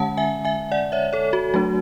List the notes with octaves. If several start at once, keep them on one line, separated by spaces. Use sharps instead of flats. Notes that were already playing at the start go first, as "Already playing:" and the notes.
Already playing: D3 G#3 C#4 F#5 A5
E5 G#5
E5 G#5
D5 F#5
C#5 E5
A4 C#5
F#4
F#3 A3 D4 F#4